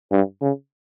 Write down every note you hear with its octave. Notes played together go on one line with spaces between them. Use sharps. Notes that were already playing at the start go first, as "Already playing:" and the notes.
G2
C#3